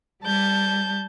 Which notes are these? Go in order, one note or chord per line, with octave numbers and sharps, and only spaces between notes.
G3 A5 G6